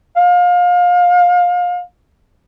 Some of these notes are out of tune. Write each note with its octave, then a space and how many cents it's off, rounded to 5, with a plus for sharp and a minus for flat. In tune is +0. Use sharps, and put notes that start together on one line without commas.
F5 +30